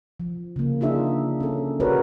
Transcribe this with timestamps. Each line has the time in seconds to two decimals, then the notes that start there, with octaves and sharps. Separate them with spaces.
0.20 F3
0.56 C#3 A#3
0.80 D3 D4 D#4 F4 G#4 E5
1.40 C#4 A4
1.80 F#4 G#4 A#4 B4 C#5 D5